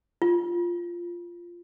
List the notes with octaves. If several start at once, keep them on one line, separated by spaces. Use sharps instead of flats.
F4